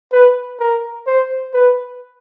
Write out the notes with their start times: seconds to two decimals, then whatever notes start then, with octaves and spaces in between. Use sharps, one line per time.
0.13 B4
0.60 A#4
1.07 C5
1.54 B4